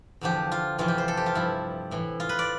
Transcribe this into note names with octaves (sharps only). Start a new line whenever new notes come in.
E2 D3 F3 G4
F4
F2 C3 E3 F4
G4
C5
A4
G4
F4
G2 F3 E4
A2 E3
F4
B4
D5